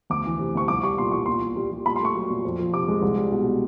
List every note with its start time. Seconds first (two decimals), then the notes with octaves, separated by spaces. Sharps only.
0.10 D2 D6
0.26 E3
0.39 C3
0.55 D2 C#6
0.68 C2 D6
0.83 G3 C#6
0.98 A#2 C6
1.12 C2 C#6
1.26 A#2 C6
1.41 A#2
1.56 G3
1.72 G3
1.86 A#2 B5
1.96 C6
2.01 A3 C#6
2.15 F#3
2.29 A#2
2.45 F2
2.59 F3
2.73 C3 D6
2.88 G#3
3.02 C2
3.18 G3
3.32 B2